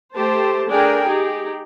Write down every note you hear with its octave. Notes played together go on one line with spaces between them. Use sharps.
A3 G4 C5 A5
A3 D4 G#4 A#4 G5 G#5
D#4 G4 G#4